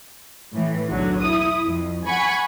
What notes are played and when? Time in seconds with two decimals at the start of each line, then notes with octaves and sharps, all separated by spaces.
0.54 A2 E3
0.89 B1 E2 D3 F#3
1.23 E4 D#6
1.67 F2
2.07 F#5 G#5 B5 C#6